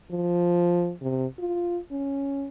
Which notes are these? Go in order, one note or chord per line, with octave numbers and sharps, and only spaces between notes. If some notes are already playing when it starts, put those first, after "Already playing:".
F3
C3
F4
C#4